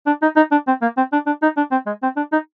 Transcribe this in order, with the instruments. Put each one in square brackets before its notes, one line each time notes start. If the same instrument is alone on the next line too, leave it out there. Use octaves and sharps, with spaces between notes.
[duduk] D4
D#4
D#4
D4
C4
A#3
C4
D4
D4
D#4
D4
C4
G#3
C4
D4
D#4